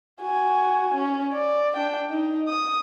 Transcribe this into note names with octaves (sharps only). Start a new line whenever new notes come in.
F#4 G#5
C#4
D5
D4 G5
D#4
D#6